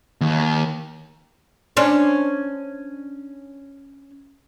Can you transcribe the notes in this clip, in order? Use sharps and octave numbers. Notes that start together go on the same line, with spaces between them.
D#2
C#4 D4 C5